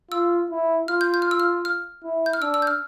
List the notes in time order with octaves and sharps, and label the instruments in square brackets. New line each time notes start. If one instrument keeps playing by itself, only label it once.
[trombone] F4 [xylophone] E6
[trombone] E4
[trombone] F4 [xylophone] F6
[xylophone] G6
G6
F6
E6
F6
F6
[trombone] E4
[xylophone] G6
F6
[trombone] D4 [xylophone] E6
[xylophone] E6
G6
F6